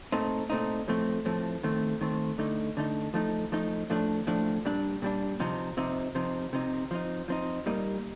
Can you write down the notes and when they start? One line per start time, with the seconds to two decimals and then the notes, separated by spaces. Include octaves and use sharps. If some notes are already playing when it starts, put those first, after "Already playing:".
0.12 A#2 A3 C4 D#4
0.50 A#2 A3 C4 D#4
0.88 A2 F3 A3 C4
1.25 A2 F3 A3 C4
1.63 D#3 A3 C4
2.01 D#3 A3 C4
2.38 D3 A3 D#4
2.77 D3 A3 D#4
3.14 F3 A3 D#4
3.52 F3 A3 D#4
3.90 A2 F3 A3 D4
4.27 A2 F3 A3 D4
4.65 A#2 G3 D4
5.02 A#2 G3 D4
5.40 C3 F3 C4 D#4
5.77 C3 F3 C4 D#4
6.15 C3 F3 C4 D#4
6.53 C3 F3 C4 D#4
6.91 F3 C4 D#4
7.28 F3 C4 D#4
7.66 A#2 G3 A#3 D#4